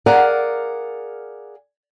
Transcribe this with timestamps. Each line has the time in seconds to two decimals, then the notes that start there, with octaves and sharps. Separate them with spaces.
0.06 G#4 A#4 D5 F5 F#5